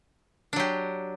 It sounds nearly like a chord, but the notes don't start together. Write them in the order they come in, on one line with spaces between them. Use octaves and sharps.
D4 F#3 G4